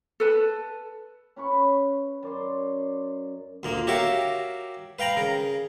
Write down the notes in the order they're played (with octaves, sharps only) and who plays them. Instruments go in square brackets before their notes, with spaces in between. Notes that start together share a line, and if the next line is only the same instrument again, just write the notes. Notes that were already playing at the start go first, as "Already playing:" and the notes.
[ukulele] A4 B4 A5
[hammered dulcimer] C#4 B4 B5 C#6
F#2 D5 C6
[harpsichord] D2 A#2 A#3
F#4 G4 A#4 C#5 E5 F5
B4 F5 G5 A#5 B5
C#3 A#4